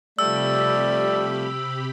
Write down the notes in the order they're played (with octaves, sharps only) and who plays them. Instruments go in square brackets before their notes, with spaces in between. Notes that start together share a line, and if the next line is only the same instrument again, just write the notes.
[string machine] C3 G4 B5 [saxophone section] F3 G3 A3 [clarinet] D5 [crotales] E6